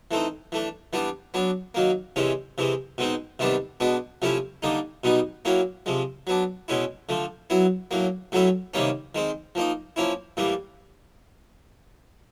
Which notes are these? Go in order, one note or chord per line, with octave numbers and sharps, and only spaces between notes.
E3 A3 C4 D#4
E3 A3 D4
E3 G3 B3 D4
F#3 B3 D4
D#3 F#3 A#3
C3 E3 G#3 C#4
C3 E3 G#3
B2 G#3 C4 D#4
C3 D#3 G3 B3 D4
B2 G#3 B3 D4
C3 F3 A3 C#4 E4
D3 G3 A#3 D#4
B2 G3 B3 D#4
F#3 A#3 C#4 E4
C3 F3 G#3
F#3 B3 D4
B2 G#3 C#4 E4
D3 F3 A3
F#3 B3 E4
A2 F#3 A#3
A2 F#3 A3 C#4 E4
C3 D#3 G3 A#3 C#4
D#3 G#3 C4
F3 A#3 D#4
F3 A#3 C#4 E4
A2 E3 G3 A#3